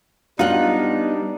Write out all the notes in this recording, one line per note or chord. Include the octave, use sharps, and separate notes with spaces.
G3 B3 D4 D#4 F4 F#5